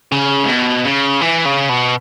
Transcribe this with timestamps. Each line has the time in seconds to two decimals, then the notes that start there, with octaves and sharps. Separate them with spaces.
0.12 C#3
0.44 G#2
0.48 B2
0.85 C#3
1.21 E3
1.45 C#3
1.70 B2